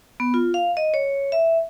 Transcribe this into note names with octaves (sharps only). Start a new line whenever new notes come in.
B3
F4
F5
D#5
C#5
E5